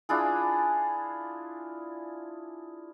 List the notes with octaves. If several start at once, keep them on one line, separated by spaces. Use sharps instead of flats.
D4 E4 F4 G#4